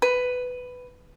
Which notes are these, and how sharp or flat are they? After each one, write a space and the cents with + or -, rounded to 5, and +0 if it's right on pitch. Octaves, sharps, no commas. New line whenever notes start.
B4 +10